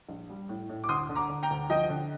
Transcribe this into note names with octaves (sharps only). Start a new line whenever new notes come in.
A#1
G3
A2
A2
D6
D2 C6 D#6
D3
A#5 D6
D3
G5 A#5
D2
F3 D#5 G5
D3